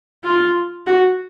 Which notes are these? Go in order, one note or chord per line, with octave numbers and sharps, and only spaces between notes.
F4
F#4